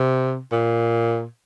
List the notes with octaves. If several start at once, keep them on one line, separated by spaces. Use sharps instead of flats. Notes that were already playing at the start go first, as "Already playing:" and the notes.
Already playing: C3
A#2